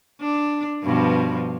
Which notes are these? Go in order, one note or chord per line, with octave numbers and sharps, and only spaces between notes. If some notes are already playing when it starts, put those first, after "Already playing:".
D4
G2 B2 F3